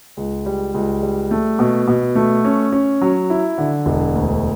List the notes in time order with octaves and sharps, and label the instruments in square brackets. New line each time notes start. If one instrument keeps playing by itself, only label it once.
[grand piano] C#2
G3
C#2
G3
A3
B2
B2
A3
C#4
C#4
F#3
E4
D3
E1
D2